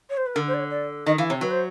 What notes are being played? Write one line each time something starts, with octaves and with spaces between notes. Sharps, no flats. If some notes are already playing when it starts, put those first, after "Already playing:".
C#5
C5
B4
D3 A#4
C5
D5
C#5
D5
D#3 D#5
E3 F5
C3 C#5
F#3 B4
C5